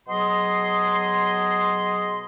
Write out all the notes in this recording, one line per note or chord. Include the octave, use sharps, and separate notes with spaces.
B2 F#3 G#4 D#5 C6